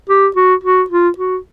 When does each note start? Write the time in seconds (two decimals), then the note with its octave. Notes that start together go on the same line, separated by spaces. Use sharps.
0.09 G4
0.36 F#4
0.64 F#4
0.90 F4
1.18 F#4